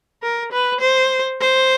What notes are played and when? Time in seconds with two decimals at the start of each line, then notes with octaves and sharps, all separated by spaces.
0.22 A#4
0.52 B4
0.81 C5
1.41 C5